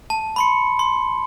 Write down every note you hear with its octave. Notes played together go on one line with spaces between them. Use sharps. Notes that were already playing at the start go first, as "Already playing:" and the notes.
A5
B5 C6 C#7
C6